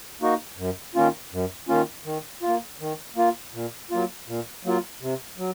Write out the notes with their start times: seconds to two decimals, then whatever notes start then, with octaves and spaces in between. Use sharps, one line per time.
0.21 A#3 D#4 F#4
0.57 F#2
0.95 D#3 A#3 C#4 F4
1.32 F#2
1.69 D#3 A#3 C#4 F4
2.05 D#3
2.42 F4
2.48 A#3
2.80 D#3
3.16 A#3 F4
3.53 A#2
3.90 F#3 A#3 F4
4.27 A#2
4.65 F#3 A#3 F4
5.01 C3
5.38 F#3